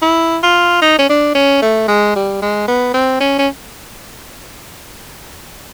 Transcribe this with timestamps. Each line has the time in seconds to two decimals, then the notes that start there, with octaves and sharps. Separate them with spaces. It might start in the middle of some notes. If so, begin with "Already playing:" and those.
0.02 E4
0.43 F4
0.82 D#4
0.99 C#4
1.09 D4
1.35 C#4
1.62 A3
1.88 G#3
2.15 G3
2.42 G#3
2.68 B3
2.94 C4
3.20 C#4
3.39 C#4